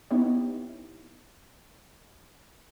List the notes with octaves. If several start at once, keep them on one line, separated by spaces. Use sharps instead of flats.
B3 D#4 E4 G4 C#5